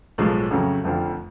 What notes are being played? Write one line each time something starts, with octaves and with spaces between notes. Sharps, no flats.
B1 A2 F3 G#3
F2 C#3 F#3 A3
F1 F2 D3 F3